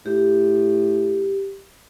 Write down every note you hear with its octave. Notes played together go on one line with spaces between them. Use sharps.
A2 G4